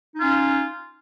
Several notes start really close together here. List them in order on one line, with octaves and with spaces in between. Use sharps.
D#4 F4 C#4